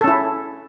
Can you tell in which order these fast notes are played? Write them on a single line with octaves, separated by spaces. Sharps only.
A4 C#4 E4